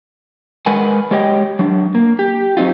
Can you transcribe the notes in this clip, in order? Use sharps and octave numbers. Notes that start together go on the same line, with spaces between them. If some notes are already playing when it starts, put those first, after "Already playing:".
G#3 A#4 B4 F#5 G#5
G#3 G4 C#5 D#5 G5
F#3 D4
A#3
G4
F#3 C4 D#4 F4